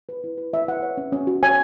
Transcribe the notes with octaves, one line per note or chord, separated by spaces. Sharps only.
B4
E4
B4
E4 E5
B4 F#5
C#5
C#4
C#4
F#4
C#5 G#5